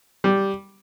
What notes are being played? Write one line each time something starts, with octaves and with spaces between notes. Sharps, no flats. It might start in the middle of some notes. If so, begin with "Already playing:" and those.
G3